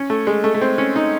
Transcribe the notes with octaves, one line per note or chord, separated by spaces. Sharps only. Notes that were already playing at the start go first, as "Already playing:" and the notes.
Already playing: C#4
A3
G#3
A3
A3
C4
C#4
D#4